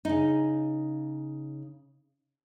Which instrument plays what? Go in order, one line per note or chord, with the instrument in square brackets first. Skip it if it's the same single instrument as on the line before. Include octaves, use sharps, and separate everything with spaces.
[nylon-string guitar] C#3 D#4